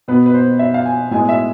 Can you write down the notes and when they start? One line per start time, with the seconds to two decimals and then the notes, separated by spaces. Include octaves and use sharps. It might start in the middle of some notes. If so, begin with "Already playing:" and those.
0.08 B2 B3 B4
0.26 B4
0.34 C5
0.59 E5
0.74 F5
0.86 G#5
1.11 A2 G#3 B3 G#5
1.29 E5